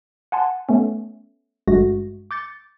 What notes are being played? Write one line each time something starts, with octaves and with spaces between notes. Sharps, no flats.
F#5 G#5 A5 C6
A3 B3 C#4
G#1 G2 G#3 A3 F#4 A#6
D6 G6 A6 C#7